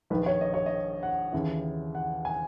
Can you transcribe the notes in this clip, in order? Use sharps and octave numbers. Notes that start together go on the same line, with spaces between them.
A#1 G#2 D#3 B4
C#5
D#5
C#5
D#5
F#5
D#2 C#3 E3
F#5
G#5